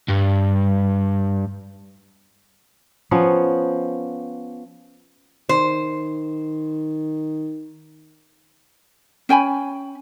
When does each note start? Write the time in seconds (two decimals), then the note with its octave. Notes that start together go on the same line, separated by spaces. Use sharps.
0.08 G2
3.11 F3 B3 C#4
5.49 D#3 C5
9.29 C#4 G5 G#5 B5